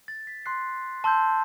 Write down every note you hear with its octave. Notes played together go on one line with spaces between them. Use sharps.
A6
B6
C6 F#6 C7
A5 C6 E6 G6